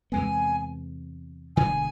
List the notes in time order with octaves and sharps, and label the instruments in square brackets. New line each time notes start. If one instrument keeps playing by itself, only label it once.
[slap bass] E2 C3 G#3 B3 [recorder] G#5
[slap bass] E1 D2 D3 [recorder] G#5